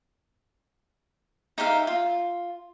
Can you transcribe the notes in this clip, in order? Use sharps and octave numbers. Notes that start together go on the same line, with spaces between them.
D#4 G4 E5 F5
F4